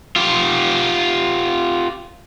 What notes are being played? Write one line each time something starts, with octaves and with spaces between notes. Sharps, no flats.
F4 G4